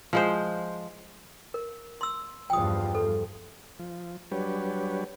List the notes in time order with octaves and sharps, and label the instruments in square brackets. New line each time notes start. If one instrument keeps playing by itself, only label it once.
[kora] F3 G#3 C5
[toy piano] A#4
C6 E6
[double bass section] E2 G2 F3 [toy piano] G5 D#6
[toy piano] A4
[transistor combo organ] F3
F#3 G3 D4 G4 B4 C#5